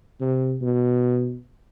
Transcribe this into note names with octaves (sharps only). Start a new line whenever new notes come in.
C3
B2